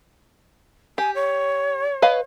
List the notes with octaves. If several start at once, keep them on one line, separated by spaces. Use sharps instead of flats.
G4 G#5
C#5
B4 D#5 F5